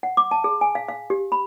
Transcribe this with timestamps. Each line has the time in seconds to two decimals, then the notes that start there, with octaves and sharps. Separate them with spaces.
0.03 F#5
0.17 D6
0.31 A5
0.44 G#4
0.61 G#5
0.75 F5
0.88 F5
1.10 G4
1.32 B5